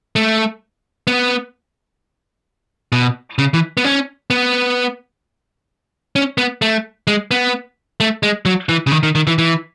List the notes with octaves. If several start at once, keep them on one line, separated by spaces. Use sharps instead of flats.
A3
B3
B2
C#3
E3
B3
C#4
B3
C#4
B3
A3
G#3
B3
A3
G#3
F#3
E3
C#3
D#3
D#3
D#3
E3
E3